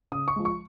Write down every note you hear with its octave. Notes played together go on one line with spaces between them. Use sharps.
C#3 D#6
C#6
F3 G#3
C#6